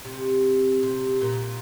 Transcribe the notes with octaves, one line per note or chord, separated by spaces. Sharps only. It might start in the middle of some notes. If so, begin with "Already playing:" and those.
C3
C3
A#2